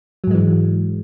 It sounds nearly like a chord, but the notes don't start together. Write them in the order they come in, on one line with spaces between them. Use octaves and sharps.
F#3 G#2 G#3 E3